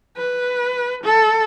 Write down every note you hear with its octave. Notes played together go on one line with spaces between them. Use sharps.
B4
A4